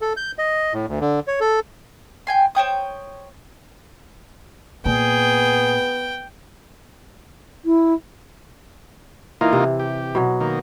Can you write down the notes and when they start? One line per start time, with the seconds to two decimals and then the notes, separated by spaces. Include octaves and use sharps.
0.01 A4
0.17 G6
0.38 D#5
0.73 A2
0.88 D2
1.01 D3
1.28 C#5
1.41 A4
2.27 G5 G#5 C6
2.55 C5 C#5 G5 D#6
4.86 A#2 B3 G#4 G5
7.65 E4
9.41 E3 A#3 D#4 F4
9.53 C3
9.80 G4
10.15 B2 F#3
10.40 D#3 A#3